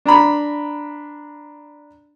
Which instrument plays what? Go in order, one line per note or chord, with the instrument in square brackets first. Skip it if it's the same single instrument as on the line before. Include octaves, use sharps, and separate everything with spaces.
[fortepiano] D4 A#5 B5